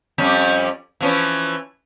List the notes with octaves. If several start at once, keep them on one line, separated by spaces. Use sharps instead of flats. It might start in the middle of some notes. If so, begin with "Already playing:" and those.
F2 G3 C#4
E3 F3 C#4